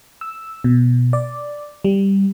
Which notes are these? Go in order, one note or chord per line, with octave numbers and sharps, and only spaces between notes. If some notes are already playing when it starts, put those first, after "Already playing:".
E6
B2
D5
G3